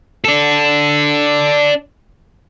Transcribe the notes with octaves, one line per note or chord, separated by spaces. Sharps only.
D4 A4